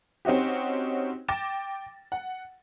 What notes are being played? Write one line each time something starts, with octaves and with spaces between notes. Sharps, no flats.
C4 C#4 D#4 F#4 G4
G5 D6 A6 A#6 E7
F#5